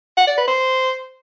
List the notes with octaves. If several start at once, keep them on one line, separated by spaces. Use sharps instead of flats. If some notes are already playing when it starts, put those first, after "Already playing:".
F#5
D5
B4
C5